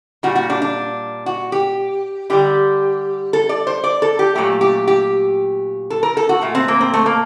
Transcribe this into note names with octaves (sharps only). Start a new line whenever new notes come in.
A#2 G3 F#4
F#4
D4
D4
F#4
G4
D3 G3 G4
A4
D5
C5
D5
A4
G4
A#2 F#3 A3 G4
G4
G4
A4
A#4
A4
F#4
A#2 A3
C4
A#3
C4
A3
A#3